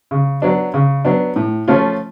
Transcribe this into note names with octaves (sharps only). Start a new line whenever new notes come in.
C#3
F#3 B3 D4
C#3
F#3 B3 D4
A2
F3 A3 C#4 F4